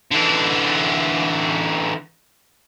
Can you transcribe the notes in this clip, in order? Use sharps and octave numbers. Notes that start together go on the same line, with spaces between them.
D3 E3